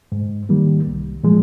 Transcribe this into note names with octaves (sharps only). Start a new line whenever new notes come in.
G#2
D#3 G3 A#3
C2
A#2 F3 G#3